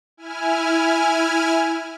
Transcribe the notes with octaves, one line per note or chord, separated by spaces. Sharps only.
E4 G#5 F6